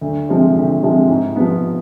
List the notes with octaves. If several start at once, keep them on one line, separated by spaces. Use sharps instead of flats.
D2
C3 F3 G#3 C4
D2
C3 F3 G#3 C4
G#2
F3 B3